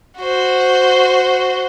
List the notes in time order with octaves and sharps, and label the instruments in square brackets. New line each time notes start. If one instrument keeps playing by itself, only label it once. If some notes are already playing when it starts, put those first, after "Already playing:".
[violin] F#4 C5